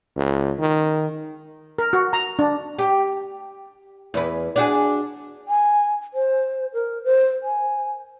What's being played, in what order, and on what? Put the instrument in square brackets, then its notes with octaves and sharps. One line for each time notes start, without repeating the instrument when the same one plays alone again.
[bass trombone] C#2
D#3
[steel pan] A#4
F#4
A#5
D4
[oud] G4
E2 B4
D4 F#4 G#4
[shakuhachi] G#5
C5
A#4
C5
G#5